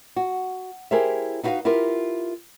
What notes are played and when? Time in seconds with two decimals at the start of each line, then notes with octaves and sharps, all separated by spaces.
0.16 F#4
0.91 E4 G4 G#4 A#4 C5 E5
1.43 D#4 E4 F#4 A#4 B4 F5
1.65 E4 F4 G4 A#4